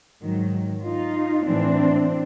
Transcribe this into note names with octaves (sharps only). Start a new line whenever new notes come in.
G#2 D#3 F#3
D#4 F4
A2 E3 C4 D4